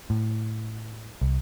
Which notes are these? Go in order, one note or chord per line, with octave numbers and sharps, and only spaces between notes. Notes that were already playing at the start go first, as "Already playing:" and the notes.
A2
C2